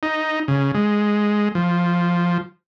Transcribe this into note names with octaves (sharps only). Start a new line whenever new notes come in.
D#4
C#3
G#3
F3